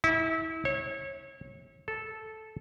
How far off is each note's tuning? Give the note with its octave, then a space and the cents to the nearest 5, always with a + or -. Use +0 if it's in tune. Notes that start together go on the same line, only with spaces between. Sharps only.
E4 -30
C#5 -30
A4 -10